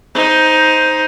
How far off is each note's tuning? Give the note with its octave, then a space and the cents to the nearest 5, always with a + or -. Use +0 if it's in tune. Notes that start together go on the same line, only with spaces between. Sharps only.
D#4 +10 C5 +0